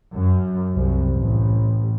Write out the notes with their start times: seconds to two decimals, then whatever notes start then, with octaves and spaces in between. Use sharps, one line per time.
0.14 F#2
0.73 C2
1.14 A1